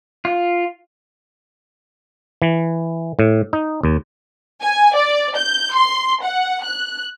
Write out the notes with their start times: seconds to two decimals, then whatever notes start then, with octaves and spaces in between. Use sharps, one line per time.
0.25 F4
2.42 E3
3.19 A2
3.53 D#4
3.83 D#2
4.61 G#5
4.95 D5
5.36 G6
5.73 C6
6.22 F#5
6.63 F#6